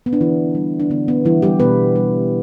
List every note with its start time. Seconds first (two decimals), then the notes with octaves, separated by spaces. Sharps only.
0.06 B3
0.13 D4
0.20 D3 E3 E4
0.55 G3
0.80 D4
0.90 D3 B3
1.08 B3
1.25 E3 G3 E4
1.42 G3 G4
1.60 B2 B3 B4
1.96 G3